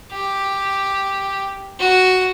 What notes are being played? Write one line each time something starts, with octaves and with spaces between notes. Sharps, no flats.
G4
F#4